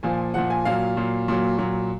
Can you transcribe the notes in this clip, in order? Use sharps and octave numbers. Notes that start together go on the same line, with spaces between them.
A#2 F3 G#5
A#2 F3 F#5
G#5
A#2 F#3 F5
A#2 F#3
A#2 F#3
A#2 F#3